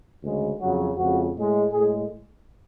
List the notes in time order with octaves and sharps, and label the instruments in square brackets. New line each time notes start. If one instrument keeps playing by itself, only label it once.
[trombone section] D2 C#3 G#3
F2 C#3 F#3 F#4
F2 C#3 F3 G#3 F#4
A2 G#3
A2 G#3 G#4